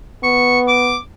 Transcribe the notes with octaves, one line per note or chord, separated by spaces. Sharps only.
B3 C#6
D6